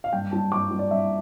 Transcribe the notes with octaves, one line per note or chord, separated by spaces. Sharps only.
F5
G2 G5
G3 A5
G2 D6
G3
D5
G2 E5